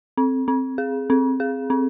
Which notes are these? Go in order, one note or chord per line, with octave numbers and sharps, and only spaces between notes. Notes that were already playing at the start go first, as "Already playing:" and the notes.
C4
C4
G#4
C4
G#4
C4